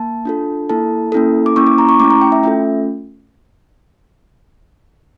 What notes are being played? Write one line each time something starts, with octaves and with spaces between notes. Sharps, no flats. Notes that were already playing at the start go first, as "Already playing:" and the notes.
Already playing: A#3 A5
D4 F4 A4
A#3 E4 A4 A5
A#3 C#4 E4 A4
D6
A#3 C#4 E4 C#6
D6
A#5
C#6
A3 C#4 E4 D6
A#5
G5
E5
A3 C#4 F4 A4 E5